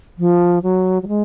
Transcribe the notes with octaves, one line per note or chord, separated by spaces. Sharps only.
F3
F#3
F#3
G#3